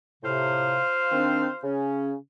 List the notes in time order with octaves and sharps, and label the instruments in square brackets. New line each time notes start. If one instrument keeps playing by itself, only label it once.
[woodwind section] A2 C3 [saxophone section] F4 C5 F5
[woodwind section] D#3 C4 D4
C#3 C#4